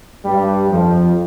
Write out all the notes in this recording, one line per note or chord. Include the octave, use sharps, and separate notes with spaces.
G2 G3
F2 F3